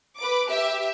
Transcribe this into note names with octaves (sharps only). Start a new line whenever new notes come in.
B4 D6
G4 E5